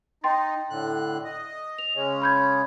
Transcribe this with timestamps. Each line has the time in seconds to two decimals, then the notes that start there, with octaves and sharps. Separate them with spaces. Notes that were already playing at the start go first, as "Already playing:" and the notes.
0.24 D#4 G5 C6 A6
0.70 A2 D3 F#6
1.24 D#5
1.78 F7
1.95 C#3 G#3 C#4
2.22 B5 G6 G#6